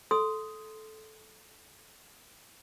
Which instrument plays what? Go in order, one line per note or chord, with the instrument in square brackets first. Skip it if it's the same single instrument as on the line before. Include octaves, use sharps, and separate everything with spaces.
[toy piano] A4 C6 D#6